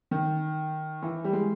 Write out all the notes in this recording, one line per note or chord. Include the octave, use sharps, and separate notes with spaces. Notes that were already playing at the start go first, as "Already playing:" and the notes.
D#3
E3
G3
G#3